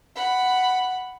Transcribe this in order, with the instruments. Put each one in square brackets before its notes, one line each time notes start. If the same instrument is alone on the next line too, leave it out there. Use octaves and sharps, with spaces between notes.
[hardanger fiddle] F#5 B5